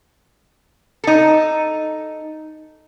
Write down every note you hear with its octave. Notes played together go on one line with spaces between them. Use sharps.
D#4 A4